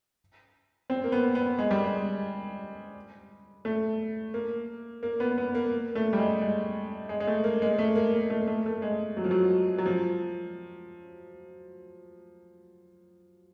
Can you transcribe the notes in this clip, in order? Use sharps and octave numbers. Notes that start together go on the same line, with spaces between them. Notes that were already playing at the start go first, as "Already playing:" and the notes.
C4
A#3
B3
B3
G#3
G3
G#3
A3
A#3
A#3
B3
B3
A#3
A3
G3
G#3
G#3
G#3
G#3
A3
A#3
G#3
A3
A#3
A#3
A3
A3
A#3
A3
G#3
F#3
F3
F#3
F#3
F3